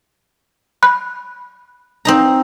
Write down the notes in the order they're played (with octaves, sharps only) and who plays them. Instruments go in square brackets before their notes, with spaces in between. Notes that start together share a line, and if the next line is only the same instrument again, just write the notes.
[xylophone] B5 F#6
[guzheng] C4 D#4 A#5